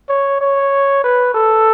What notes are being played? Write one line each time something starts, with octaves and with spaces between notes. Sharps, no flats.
C#5
C#5
B4
A4